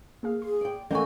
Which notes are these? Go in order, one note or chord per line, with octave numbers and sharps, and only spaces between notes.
A#3 G#4 F5
G#4 C6
D5 G5
E3 A3 A#3 A4 F#5 G#5 C#6 G6